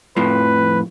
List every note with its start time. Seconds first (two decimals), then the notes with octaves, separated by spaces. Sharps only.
0.17 F2 A2 F3 B4